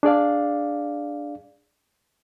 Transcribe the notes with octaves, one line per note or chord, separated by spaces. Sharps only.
D4 G#4 D5 F5